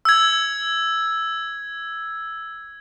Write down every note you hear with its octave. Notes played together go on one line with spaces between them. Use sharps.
E6 G#6